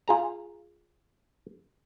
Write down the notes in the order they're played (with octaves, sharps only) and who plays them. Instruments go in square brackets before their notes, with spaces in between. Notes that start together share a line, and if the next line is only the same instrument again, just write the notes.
[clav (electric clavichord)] F4 G#4 A#5